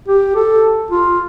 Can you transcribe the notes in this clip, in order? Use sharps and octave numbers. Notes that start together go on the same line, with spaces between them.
G4
A4
F4